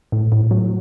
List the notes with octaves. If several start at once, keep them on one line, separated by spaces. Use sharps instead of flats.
A2
A2
F#3